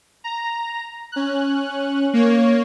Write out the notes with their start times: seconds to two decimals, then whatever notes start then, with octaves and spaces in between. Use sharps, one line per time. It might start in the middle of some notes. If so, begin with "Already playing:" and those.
0.24 A#5
1.12 C#4 F#6
2.13 A#3 C#5